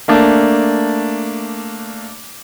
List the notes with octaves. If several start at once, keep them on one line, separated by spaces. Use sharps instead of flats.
A3 A#3 D4